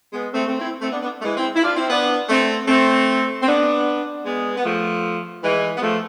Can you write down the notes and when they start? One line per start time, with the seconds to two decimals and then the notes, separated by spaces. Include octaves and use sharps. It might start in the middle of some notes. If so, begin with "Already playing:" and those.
0.13 G#3 B3
0.32 A3 C4
0.46 A3 C4
0.59 C4 E4
0.81 A3 C4
0.91 B3 D4
1.01 B3 D4
1.20 A3
1.24 E3 G#3
1.37 C4 E4
1.55 E4
1.63 D4 F4
1.76 C4 E4
1.89 B3 D4
2.29 A3 C4
2.67 A3 C4
3.42 C4
3.47 B3 D4
4.25 G#3 B3
4.57 B3
4.64 F3 A3
5.43 E3 G#3
5.76 B3
5.82 F3 A3